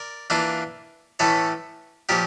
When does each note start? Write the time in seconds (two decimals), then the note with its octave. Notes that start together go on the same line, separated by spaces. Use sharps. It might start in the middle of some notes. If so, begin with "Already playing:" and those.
Already playing: A#4 D5
0.30 E3 A#3 D4 F4
1.19 A2 E3 A3 C#4 A4 C#5
2.09 A#2 F3 C#4 G4 A#4